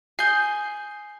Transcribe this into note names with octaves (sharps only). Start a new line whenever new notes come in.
G#4 G6 C7